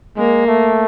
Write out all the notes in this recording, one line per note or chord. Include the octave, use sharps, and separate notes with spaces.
G#3 A#3
A3